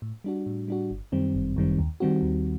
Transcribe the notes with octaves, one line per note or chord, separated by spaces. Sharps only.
A2
G3 D4 F#4
A2
G3 D4 F#4
G1
F#2 D#3 G3 C4
G1
F#2 D#3 G3 C4
D#2
D#3 G3 C4 F#4
D#2